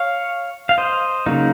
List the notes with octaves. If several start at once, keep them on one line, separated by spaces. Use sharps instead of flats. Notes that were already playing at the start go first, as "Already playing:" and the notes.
Already playing: C#5 F5
F5
C5 D#5
C#3 F#3 A#3 D#4